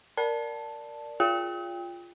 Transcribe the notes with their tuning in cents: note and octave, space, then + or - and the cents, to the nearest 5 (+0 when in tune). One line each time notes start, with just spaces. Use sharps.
A#4 +0 D5 +0 A5 +0
F4 +0 G#4 +0 G5 +20